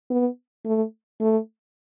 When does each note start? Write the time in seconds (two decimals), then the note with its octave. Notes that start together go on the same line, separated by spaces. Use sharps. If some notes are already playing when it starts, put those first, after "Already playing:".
0.10 B3
0.65 A3
1.21 A3